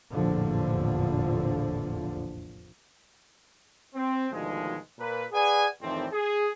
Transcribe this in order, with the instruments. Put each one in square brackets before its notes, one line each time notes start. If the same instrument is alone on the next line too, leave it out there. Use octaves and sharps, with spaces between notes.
[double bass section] F1 A#1 E2 A2 D3 F3
[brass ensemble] C4
D2 B2 D#3 F3 G#3
A#2 A#4 B4
G#4 B4 D5 F#5 G#5
F2 A2 D#3 E3 G3 C4
G#4